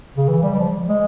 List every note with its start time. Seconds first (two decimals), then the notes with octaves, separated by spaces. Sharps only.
0.17 C#3
0.28 E3
0.43 G3
0.53 G3
0.59 F3
0.89 G#3